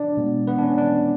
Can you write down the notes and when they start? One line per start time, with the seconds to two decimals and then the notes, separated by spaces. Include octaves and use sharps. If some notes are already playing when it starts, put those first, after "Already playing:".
Already playing: D4 D5
0.17 B2 G#3 B3
0.47 B3 B4
0.58 D4
0.63 C#4
0.78 D4